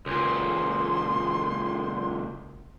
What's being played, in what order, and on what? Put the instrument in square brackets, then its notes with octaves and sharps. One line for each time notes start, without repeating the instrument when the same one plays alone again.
[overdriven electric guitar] C#2 A#2 [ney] C6